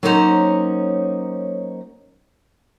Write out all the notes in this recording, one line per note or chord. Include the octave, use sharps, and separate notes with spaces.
F#3 A#3 C#4 D#4 C5 A#5